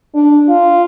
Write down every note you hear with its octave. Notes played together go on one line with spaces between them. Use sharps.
D4
F4